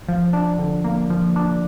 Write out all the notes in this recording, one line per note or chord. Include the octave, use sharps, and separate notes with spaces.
F3
D4
D3
A#3
F3
D4